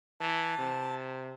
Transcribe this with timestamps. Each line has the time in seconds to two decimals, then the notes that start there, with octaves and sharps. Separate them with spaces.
0.21 E3 A5
0.59 C3